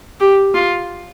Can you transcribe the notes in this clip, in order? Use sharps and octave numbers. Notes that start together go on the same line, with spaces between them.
G4
F4